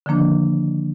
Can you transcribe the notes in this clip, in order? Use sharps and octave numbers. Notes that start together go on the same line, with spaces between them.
D3 D#3 F3 A#3 D4